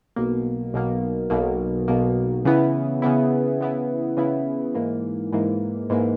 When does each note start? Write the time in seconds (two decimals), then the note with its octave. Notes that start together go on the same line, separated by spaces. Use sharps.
0.16 B1 B2 A#3
0.73 B1 B2 A#3
1.30 B1 B2 A#3
1.88 B1 B2 A#3
2.45 C#3 E3 B3 E4
3.02 C#3 E3 B3 E4
3.61 C#3 E3 B3 E4
4.17 C#3 E3 B3 E4
4.75 G#2 E3 A#3
5.33 G#2 E3 A#3
5.90 G#2 E3 A#3